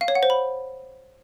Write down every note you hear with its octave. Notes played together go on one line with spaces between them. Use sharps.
F5
C#5
F#5
C5
B5